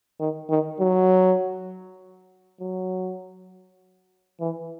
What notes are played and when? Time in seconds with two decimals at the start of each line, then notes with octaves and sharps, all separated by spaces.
0.20 D#3
0.50 D#3
0.80 F#3
2.60 F#3
4.40 E3